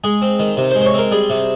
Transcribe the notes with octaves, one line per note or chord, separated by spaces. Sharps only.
G#3 G#4
C4
D#3
C3
C5
G#3
C5
C#5
C4 A#4
G3 G#4
C3